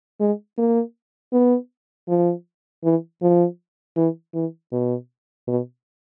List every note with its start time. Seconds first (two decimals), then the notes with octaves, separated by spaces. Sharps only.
0.20 G#3
0.58 A#3
1.33 B3
2.09 F3
2.84 E3
3.22 F3
3.97 E3
4.34 E3
4.72 B2
5.48 B2